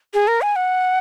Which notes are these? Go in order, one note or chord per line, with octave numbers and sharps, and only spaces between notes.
G#4
A#4
G#5
F#5